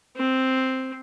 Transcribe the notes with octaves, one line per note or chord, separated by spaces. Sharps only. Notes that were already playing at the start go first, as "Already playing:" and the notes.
C4